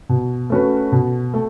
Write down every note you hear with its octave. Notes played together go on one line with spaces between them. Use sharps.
B2
A3 C#4 F#4 B4
B2
A3